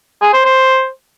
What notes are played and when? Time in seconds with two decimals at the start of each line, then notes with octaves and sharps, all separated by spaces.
0.21 G#4
0.33 C5
0.45 C5